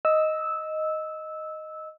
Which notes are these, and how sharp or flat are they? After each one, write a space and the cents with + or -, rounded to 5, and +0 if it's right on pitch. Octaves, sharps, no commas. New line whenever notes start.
D#5 +0 E6 -15